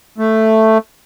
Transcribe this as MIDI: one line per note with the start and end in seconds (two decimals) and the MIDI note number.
0.18 0.78 57